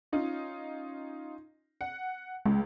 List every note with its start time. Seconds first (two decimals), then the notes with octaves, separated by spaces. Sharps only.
0.12 C#4 D#4 F4
1.81 F#5
2.46 C#2 G#3